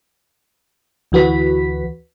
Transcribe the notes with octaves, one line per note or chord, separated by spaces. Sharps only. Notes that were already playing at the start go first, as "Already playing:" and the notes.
D2 E3 F#4 B4 B6